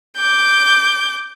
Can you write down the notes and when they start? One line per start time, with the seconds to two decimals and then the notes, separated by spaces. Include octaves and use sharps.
0.17 D6 G6